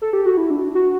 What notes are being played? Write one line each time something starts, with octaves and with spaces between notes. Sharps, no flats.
A4
G4
F#4
E4
D4
F#4